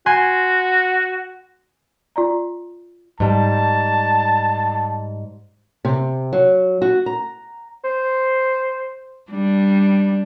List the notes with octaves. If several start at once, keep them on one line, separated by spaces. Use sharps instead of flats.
F#4 G#5 C6 F#6
F4 D5 A#5
G#2 G3 A5
C3
F#3
F#4
A#5
C5
G3 D4